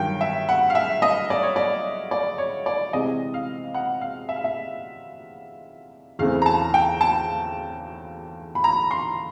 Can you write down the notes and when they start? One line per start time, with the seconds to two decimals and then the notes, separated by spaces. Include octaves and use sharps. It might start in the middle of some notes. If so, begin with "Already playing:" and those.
Already playing: G2 D#3 F#3 G5
0.21 E5
0.49 F#5
0.70 F5
0.75 E5
1.02 D#5
1.30 D5
1.43 C#5
1.56 D5
2.11 D5
2.38 C#5
2.66 D5
2.93 C3 E3 G#3 C4 D#5
3.34 F5
3.74 F#5
4.01 F5
4.29 E5
4.36 F5
4.44 E5
6.19 E2 C#3 E3 A3 C4 F5
6.42 A#5
6.46 A5
6.74 G5
7.01 A5
8.55 B5
8.64 A#5
8.91 C6